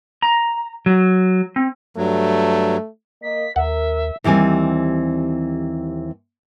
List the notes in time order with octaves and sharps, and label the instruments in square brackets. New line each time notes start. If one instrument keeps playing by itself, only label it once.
[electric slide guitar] A#5
F#3
C4
[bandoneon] G2 F#3 [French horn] A3
[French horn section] A#3 D#5 [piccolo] B6
[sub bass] D#2 [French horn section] A#4 [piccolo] E5 [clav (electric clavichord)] F#5
[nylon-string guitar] D#2 E3 G3 C4 G#5